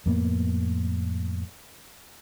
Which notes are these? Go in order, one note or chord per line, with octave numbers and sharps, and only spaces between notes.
F2 A2 A#3 B3